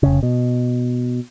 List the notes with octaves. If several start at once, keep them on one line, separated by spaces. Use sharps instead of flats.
F1 C#3
B2